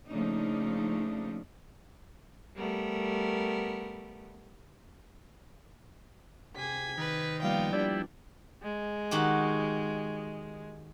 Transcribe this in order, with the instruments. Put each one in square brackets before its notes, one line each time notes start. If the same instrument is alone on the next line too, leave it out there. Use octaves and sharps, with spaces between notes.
[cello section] C#3 F3 A3 A#3 D4 D#4
[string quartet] G3 A3 B3 A#4
[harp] C3 [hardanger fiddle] G#4 [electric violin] G#6 B6
[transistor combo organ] D#3 [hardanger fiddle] B4
[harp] F3 G3 A#3 [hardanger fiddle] B3 G5 [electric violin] F5
[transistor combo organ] G3 E4 [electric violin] D4 [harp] D5
[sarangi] G#3
[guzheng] D#3 F#4 G4